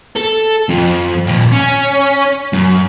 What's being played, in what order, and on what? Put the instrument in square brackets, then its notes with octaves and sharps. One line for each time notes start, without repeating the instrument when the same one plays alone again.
[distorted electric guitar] A4
F2
D#2 A#2
C#4
F#2